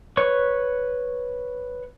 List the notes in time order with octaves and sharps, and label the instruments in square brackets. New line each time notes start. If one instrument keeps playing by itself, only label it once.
[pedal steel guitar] B4 C#5 C#6